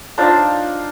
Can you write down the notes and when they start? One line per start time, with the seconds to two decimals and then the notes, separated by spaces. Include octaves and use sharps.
0.18 D4 D#4 F4 C5